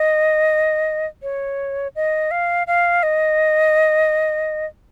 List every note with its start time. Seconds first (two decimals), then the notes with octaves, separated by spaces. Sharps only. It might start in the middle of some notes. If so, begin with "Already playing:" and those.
Already playing: D#5
1.23 C#5
1.96 D#5
2.31 F5
2.67 F5
3.03 D#5